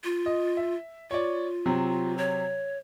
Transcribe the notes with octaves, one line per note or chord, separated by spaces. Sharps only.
F4
D#5
E5
F4 C#5 D5
C3 F#3 C4
C#5